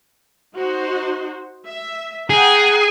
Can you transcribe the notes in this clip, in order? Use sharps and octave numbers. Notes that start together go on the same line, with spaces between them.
D#4 F#4 C5
E5
G#4 F#5 G5 A#5